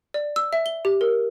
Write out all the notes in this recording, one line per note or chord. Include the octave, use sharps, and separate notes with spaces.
D5
E6
E5
G7
G4
A#4